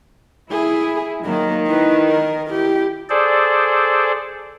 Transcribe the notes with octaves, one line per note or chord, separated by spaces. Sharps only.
E4 G#4
D#3 F#3 A#3
E4 B4
A#4
E4 G4
G#4 A4 C5 D5